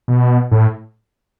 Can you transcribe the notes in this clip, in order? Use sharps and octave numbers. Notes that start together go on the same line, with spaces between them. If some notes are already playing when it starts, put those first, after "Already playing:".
B2
A2